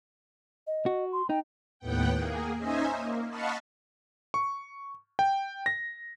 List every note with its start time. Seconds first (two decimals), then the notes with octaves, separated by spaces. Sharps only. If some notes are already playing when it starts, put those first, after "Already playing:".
0.67 D#5
0.86 F#4
1.12 C6
1.30 D#4 G5
1.79 D#2 A2 B3 F#5 G5
2.15 A#3 G#4
2.57 C#4 D#4 C5 D#5 E5 G#5
2.95 A#3
3.28 D#5 F5 F#5 A5 B5 C#6
4.34 C#6
5.19 G5
5.66 A#6